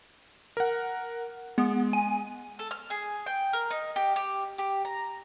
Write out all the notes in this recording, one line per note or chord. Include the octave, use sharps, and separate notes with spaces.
A#4 F#5
G#3 B3
G#5
A4
F6
G#4
G5
A#4
D#4
G4
G4
G4
A#5